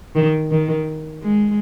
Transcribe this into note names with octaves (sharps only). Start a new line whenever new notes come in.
D#3
D#3
G#3